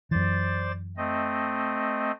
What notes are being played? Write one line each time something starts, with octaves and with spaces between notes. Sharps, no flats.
F#2 E3 C5 D5 A6
A3 C4 D#5